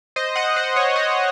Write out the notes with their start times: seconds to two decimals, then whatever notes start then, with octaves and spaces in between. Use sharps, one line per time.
0.16 C5 D#5
0.36 D#5 F#5
0.56 C5 D#5
0.76 C#5
0.96 C5 D#5